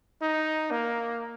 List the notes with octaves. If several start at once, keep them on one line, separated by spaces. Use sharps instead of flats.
D#4
A#3